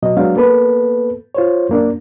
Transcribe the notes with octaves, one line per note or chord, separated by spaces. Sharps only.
B2 F#3 D#5
F#3 G#3 B3 D4 F5
A#3 B3 A4 B4
F4 C5 C#5
F#2 A#3 D4